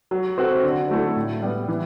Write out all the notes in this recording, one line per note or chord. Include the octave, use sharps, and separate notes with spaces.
F#3
C4 F#4 A4
D3
F#3 A3 E4 A4
A2
G3 B3
E3